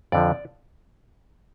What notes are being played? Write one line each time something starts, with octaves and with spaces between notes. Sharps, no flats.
F2 D3 F3 D5